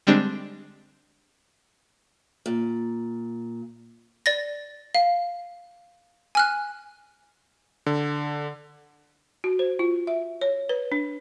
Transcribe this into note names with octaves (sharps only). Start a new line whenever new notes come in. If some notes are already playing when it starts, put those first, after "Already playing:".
D3 G3 G#3 C4 D4
A#2
D5 A6 A#6
F5
G#5 F6 F#6
D3
F#4
C5
F4
E5
C#5
B4
D4